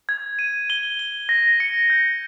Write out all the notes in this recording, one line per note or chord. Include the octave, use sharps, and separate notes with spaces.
G#6
D#7
G7
G7
A#6
C#7
G6